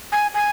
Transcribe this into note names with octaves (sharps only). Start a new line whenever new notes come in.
G#5
G#5